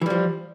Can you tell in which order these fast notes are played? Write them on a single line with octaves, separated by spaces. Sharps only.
E3 G3 F3